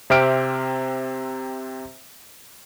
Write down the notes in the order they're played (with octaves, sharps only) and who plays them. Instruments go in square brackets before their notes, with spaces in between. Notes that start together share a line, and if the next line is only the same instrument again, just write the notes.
[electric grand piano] C3 C4 G4 E5 F6 D7